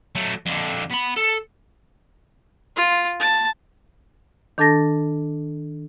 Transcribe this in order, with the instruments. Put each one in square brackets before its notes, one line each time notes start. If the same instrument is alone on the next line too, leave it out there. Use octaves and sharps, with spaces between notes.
[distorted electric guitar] F#3 A3
F2 D3
B3 B5
A4
[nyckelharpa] F4
A5
[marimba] D#3 D4 A4 A5 A6 A#6